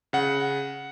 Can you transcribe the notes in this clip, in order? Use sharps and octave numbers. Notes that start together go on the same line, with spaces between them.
C#3 F#5